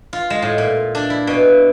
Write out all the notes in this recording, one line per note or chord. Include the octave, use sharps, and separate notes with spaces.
F4
G#3
A2
A#2
D4
E4
B2